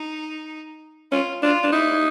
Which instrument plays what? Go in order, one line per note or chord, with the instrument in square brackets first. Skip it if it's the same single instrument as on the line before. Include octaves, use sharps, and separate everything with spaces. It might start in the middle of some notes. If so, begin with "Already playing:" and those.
Already playing: [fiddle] D#4
[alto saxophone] C#4 [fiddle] F4
[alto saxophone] D4 [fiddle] F4
[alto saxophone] D4
[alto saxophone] D#4 [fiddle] E4